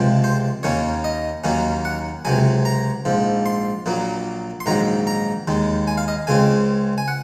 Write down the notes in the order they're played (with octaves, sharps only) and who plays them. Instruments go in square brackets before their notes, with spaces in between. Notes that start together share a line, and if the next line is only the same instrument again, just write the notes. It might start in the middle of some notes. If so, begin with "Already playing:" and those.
Already playing: [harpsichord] C#2 C3 F3 G#3 C4
C5
D#2 D#3 A#3 C#4 C#5
D#5
D#2 D#3 F#3 A#3 C#4
F#5
C#2 C3 F#3 G#5
A#5
A#1 G#2 F3
C6
A#1 A#2 F#3 A#3
C6
A#1 G#2 D#3 F#3 A#5
A#5
D#2 D#3 G#3
G#5
F5
D#5
C#2 C#3 G#3 C4 G#5
G#5
F#5